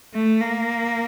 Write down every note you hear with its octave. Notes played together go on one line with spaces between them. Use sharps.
A3
A#3